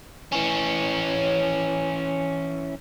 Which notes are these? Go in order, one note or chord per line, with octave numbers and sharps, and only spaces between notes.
E3 C#4